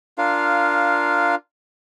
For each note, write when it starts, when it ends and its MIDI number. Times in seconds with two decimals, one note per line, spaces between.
0.18 1.35 62
0.18 1.35 65
0.18 1.35 70
0.18 1.35 77